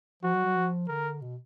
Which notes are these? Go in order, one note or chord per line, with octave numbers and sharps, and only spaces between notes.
F3 F#4
F#3
F#3
F3
D3 A#4
B2